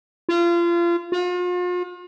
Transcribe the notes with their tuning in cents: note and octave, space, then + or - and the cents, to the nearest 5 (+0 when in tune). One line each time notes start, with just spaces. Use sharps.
F4 -30
F4 +40